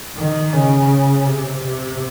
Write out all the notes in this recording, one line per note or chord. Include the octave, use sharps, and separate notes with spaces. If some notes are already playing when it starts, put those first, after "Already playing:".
D#3
C#3
C3
C3